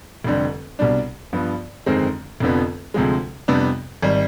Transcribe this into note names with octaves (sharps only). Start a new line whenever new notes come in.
F1 F2 D3 G3
C2 B2 G3 D4
G2 F3 B3
G1 F2 D#3 G#3 C4
F1 F2 D3 F3 B3
D2 C3 F3 G#3
F2 C3 G3 B3 D4
G#1 G3